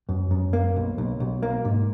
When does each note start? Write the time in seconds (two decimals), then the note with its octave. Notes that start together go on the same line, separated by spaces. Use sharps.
0.09 F#2
0.31 F#2
0.53 A#3
0.76 B1
0.98 B1
1.20 B1
1.43 A#3
1.65 G#2